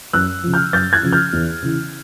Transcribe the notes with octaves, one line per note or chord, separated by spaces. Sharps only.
F#2 E6 F#6
C#3 F3
F6 G6
F#2 G6 A6
F#6 G#6
C#3 F3
F6 G6
E2
C#3 E3